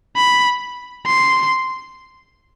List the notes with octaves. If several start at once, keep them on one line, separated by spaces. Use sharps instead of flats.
B5
C6